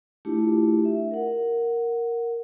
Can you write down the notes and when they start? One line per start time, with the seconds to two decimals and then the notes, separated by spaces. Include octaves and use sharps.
0.25 A3 D4 E4 F4 G4
0.85 E5
1.11 A#4 F#5